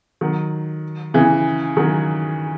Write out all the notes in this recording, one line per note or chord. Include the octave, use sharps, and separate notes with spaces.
D#3 F#3
C#3 E3
D#3 F#3